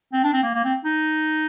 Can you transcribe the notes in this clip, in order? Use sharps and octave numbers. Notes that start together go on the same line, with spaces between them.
C4
D4
C4
A#3
A#3
C4
D#4